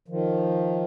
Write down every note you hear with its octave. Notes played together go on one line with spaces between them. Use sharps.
D#3 F3